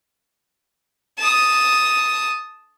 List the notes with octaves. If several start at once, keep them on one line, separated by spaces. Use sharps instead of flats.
A5 D#6